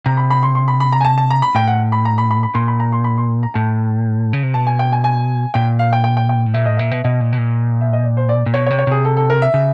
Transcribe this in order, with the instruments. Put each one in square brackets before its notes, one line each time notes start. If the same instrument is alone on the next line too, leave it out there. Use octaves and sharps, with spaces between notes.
[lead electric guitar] C3 [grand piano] A#5
[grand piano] B5
B5
C6
C6
B5
B5
A#5
G#5
A5
A5
A#5
B5
[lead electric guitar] A2 [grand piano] G5
[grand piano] F#5
B5
A#5
B5
B5
B5
[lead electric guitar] A#2 [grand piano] C6
[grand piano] B5
A#5
C6
B5
C6
A#5
[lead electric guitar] A2 [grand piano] A5
[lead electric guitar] C#3
C3
[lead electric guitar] B2 [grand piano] A5
[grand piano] G#5
G5
G#5
G#5
[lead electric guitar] A#2 [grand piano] G5
[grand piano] F5
G5
G5
G5
G5
[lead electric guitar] A2
[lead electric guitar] A#2 [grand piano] E5
[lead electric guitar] A2 [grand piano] D#5
[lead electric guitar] A#2 [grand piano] E5
[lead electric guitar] B2
[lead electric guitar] B2 [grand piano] D#5
[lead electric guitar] A#2
B2
A#2
[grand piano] E5
D#5
D5
C5
D5
[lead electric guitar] A#2
[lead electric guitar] B2 [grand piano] C#5
[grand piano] C#5
[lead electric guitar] C3
[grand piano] C#5
[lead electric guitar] C3 [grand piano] G#4
[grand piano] A4
A4
A#4
E5
[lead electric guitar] C#3